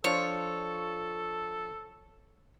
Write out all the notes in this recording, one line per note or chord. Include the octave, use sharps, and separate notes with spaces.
F3 D4 F4 A4 C#5